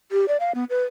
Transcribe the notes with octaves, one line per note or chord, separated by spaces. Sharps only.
G4
D5
F5
B3
B4